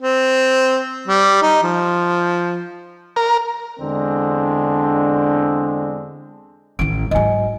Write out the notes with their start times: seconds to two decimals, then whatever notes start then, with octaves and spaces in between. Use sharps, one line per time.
0.02 C4
1.08 G3
1.42 D#4
1.63 F3
3.16 A#4
3.80 E2 D3 G#3 C4 D4
6.79 A1 D#3 D7
7.11 G#2 F#3 D#5 G#5